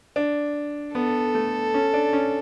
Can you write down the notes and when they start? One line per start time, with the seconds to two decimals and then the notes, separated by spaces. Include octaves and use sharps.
0.16 D4
0.94 B3 A4
1.35 A3
1.74 C#4
1.94 D4
2.13 C#4